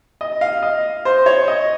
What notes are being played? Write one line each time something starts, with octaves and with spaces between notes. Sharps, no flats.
D#5
F5
D#5
C5
C#5
D#5